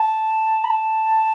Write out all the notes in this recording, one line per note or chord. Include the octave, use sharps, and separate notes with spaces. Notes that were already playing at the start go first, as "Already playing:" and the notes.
Already playing: A5
B5
A5